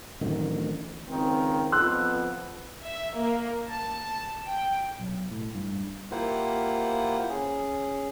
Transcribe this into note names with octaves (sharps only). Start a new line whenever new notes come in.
D1 A1 D2 D#3
C#2 D#3 C4
F2 B3 C6 E6 F#6
E5
A#3
A5
G5
B1
A2
G2
A#3 E4 F4 G4 C5 F#5
C#4 G#4